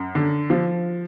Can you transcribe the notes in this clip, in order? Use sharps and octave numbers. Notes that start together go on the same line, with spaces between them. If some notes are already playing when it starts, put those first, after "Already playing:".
Already playing: F#2
D3
F3